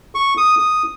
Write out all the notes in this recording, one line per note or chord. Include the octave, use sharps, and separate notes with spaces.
C#6
D#6
D#6